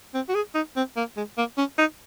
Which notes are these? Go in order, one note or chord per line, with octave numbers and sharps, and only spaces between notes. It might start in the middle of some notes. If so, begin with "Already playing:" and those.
C4
F#4
G#4
D#4
C4
A#3
G#3
A#3
C#4
D#4